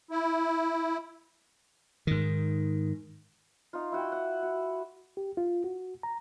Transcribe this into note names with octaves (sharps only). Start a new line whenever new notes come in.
E4
G#2 D#3
D#4 F4
E4 F#4 G5
F#5
F#4
G4
F4
F#4
A#5